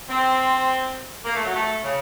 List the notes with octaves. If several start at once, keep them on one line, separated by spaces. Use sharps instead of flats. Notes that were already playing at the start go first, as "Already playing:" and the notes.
C4
A#3
A3
F#3
A3
C#3